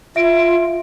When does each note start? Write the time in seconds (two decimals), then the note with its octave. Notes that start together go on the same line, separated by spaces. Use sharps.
0.16 F4 E5 D7